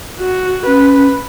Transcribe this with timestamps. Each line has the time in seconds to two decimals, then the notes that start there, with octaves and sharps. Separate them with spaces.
0.19 F#4
0.67 C#4 B4